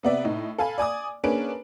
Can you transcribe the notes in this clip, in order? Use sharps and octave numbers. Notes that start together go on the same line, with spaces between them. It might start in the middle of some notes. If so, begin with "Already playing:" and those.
C3 B3 D5 E5
A2 D#4
A4 F5 G#5 B5
D5 G#5 D6 D#6
A#3 C#4 D4 G#4 B4 D7